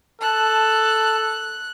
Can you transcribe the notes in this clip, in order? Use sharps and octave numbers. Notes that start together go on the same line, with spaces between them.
A4 A5 F#6